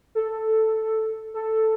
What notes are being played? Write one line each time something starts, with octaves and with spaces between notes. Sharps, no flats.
A4
A4